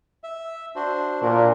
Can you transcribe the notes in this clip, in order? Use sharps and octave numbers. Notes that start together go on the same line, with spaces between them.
E5
D4 F#4 C5
A#2 D4 A#4